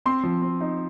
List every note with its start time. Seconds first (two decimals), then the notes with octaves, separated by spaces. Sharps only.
0.06 C4 C6
0.23 F3
0.42 C4
0.61 D#4